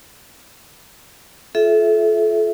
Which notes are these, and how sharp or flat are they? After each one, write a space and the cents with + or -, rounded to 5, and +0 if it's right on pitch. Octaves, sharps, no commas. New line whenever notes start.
F4 +0 A4 -30 E5 +0